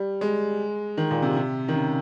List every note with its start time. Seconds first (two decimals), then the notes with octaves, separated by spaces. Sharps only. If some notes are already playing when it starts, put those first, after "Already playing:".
Already playing: G3
0.21 G#3
0.97 D#3
1.11 A#2
1.22 C3
1.36 C3
1.68 D#3
1.74 C#3